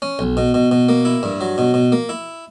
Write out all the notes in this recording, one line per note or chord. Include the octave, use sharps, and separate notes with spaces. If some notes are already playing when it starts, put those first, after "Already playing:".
C#4
B1
B2
B2
B2
A#3
E4
G2
F#3
B2
B2
A#3
E4